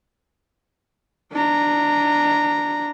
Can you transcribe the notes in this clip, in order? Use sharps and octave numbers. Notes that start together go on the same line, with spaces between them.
D4 A#5